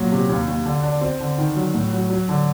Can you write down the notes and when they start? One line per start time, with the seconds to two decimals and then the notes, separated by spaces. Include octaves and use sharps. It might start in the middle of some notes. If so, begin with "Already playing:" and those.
Already playing: A#2 F#3
0.12 C3
0.29 D#2
0.48 D#2
0.66 D3
0.83 D4
1.01 C4
1.20 D3
1.38 D#3
1.56 F#3
1.74 A2
1.93 F#3
2.10 F#3
2.29 D3